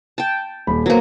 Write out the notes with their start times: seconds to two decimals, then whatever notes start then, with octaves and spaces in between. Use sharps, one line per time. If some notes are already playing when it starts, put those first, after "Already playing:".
0.18 G5 A5
0.67 D#1 B5
0.86 F#3 A#3 B3 B4 C5